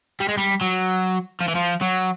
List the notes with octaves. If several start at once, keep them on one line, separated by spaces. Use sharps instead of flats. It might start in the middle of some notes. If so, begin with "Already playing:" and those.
G3
G#3
G3
F#3
F3
E3
F3
F#3